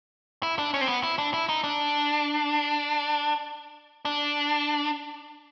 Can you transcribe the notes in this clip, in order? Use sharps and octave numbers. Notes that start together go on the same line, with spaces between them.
E4
D4
C#4
C4
B3
E4
D4
E4
D#4
D4
D4